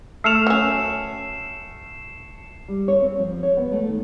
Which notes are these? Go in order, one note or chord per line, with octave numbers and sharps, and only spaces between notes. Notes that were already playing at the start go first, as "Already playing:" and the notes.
A3 E6 F6 C7 C#7 E7 F7
F#3 C#4
G3
C#5
C4
F3
C#5
B3
A3
D#3